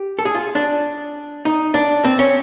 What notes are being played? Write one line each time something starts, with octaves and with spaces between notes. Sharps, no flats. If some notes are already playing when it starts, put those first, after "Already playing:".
Already playing: G4
A4
G#4
F4
D4
D#4
D4
C4
C#4